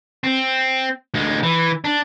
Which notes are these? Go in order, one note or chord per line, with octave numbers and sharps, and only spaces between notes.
C4
D2 G#3
E3
D4